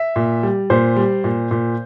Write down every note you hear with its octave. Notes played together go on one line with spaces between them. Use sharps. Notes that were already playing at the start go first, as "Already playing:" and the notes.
Already playing: E5
A#2
G3
A#2 C5
G3
A#2
A#2